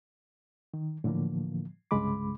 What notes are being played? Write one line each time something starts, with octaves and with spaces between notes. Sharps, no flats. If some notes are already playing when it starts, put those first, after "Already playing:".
D#3
A2 D3 E3 F3 A#3
C2 G2 C#3 G#3 B5 D6